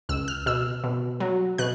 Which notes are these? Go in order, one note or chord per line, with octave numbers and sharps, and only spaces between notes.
C#2 E6
F6
B2 E6
B2
F#3
B2 F#6